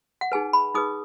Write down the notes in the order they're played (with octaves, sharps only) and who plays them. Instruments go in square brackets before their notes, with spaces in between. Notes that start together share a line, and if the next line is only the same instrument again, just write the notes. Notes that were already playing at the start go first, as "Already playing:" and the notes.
[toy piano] F#5
D#4 G#4 B4 G#5
B5
D#4 G#4 B4 D#6